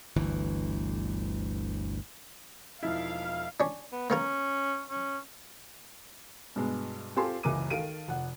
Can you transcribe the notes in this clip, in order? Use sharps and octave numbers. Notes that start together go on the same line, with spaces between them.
G1 D2 E3
E1 F3 D#4 E4 F5
C#4 D4
B3
A#3 B3 C#4 A#4
C#4
G2 B2 G#3 B3
C4 F4 G4 A4 G#5 C6
F#1 C#2 E3 A#4 D6 D#7
D#3 A4 F5 D7 D#7
F1 F#5